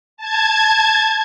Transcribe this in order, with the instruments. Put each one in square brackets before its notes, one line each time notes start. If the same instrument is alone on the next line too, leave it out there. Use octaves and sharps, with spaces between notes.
[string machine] A5 G#6